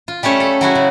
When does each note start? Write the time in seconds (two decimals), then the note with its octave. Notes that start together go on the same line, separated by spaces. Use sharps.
0.08 F4
0.23 G3 A3 C#4 C#5 E5
0.40 A4
0.61 F#3 E4 F#4 G#4
0.75 C#3